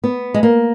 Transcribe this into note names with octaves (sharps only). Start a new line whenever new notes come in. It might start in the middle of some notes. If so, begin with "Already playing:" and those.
B3
G#3
A#3